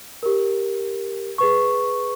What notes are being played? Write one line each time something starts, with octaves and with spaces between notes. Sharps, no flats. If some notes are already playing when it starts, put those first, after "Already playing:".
G4 A#4
G#4 B4 C#6